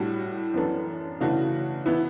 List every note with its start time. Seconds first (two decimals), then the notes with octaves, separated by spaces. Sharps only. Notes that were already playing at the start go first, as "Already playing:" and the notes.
Already playing: A2 G3 D4 F#4
0.54 F#2 E3 B3 D4 A4
1.20 C#3 E3 A3 D4 F#4
1.86 E3 B3 E4